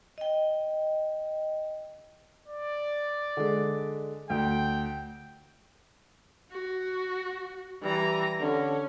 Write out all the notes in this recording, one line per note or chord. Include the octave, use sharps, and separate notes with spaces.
D#5 G5
D5
D3 G#3
D2 G5
F#4
E3 G3 A#5
D3 C#4